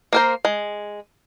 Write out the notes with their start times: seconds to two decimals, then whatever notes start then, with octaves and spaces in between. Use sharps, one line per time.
0.13 A#3 A#4 C5
0.45 G#3